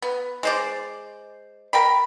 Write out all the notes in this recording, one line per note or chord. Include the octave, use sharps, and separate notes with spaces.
B3
G#3 C5 D5
A#4 G5 B5